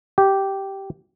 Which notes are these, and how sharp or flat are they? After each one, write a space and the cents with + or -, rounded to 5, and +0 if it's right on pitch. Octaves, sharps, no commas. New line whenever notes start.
G4 -10